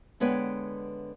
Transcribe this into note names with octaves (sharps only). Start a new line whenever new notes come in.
D3 G#3 B3 B4 C#5 G5